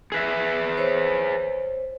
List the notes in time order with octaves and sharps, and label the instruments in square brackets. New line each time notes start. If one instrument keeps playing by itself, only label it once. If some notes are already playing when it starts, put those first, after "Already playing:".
[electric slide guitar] G#4 B4 E5
[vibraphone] C5 C#5